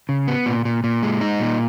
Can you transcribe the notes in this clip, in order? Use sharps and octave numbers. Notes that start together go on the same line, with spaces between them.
C#3
B3
A#2
A#2
A#2
G#3
D#4
A#2